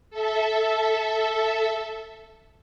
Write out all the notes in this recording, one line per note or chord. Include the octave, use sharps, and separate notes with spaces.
A4 E5